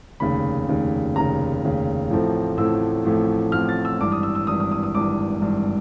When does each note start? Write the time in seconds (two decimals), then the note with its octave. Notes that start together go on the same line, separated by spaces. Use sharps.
0.20 F1 D#2 C#3 B5
0.68 F1 D#2 C#3
1.16 F1 D#2 C#3 A#5
1.62 F1 D#2 C#3
2.10 A1 A2 F3 A3 C4
2.57 A1 A2 F3 A3 C4 E6
3.05 A1 A2 F3 A3 C4
3.52 A1 A2 F3 A3 C4 F6
3.69 A6
3.85 E6
4.00 G#1 G2 E3 D6
4.12 D#6
4.23 E6
4.35 E6
4.47 G#1 G2 E3 D#6
4.60 D#6
4.72 D#6
4.83 D#6
4.95 G#1 G2 E3 D6
5.42 G#1 G2 E3